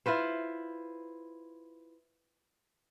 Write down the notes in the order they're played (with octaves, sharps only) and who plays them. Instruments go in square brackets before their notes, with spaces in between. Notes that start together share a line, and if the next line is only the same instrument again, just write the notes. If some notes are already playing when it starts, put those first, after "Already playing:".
[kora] E4 F4 B4 C5